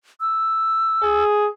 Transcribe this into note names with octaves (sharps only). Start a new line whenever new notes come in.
E6
G#4